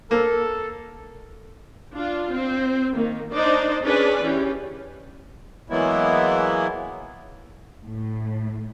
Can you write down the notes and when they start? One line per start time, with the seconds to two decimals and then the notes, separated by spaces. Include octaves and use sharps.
0.11 A#3 A4
1.95 D4 F4
2.31 C4
2.94 D#3 A#3
3.32 D4 D#4 C5 D5 D#5
3.83 C#4 D4 G#4 B4 D5
4.22 E3 C#4 G4
5.70 E3 F#3 G#3 A#3 B3 E4
7.84 A2